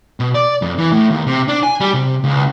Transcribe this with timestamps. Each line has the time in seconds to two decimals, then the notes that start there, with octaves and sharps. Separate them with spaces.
0.20 B2
0.35 D5
0.62 F2
0.78 E3
0.92 A2
1.10 D#2
1.27 C3
1.48 D4
1.63 G#5
1.80 G3
1.94 C3
2.24 C#2